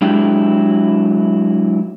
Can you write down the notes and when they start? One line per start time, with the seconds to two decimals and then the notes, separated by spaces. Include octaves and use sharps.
0.02 F#3 G#3 D4 E4 G4 G5